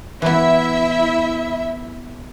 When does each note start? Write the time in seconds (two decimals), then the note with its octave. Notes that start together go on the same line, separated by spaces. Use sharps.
0.22 E3 B3 E4 E5